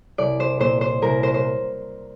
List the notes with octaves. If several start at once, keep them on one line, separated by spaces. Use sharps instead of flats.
C2 D5
C5
A#2 C5
C5
C2 A#4
C5
C5